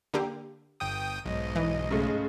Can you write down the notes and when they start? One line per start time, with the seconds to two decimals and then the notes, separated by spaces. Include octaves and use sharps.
0.14 D3 A#3 G4
0.80 G1 G5 D#6
1.25 B1 G#2 D#5
1.56 E3
1.91 C#3 G#3 A3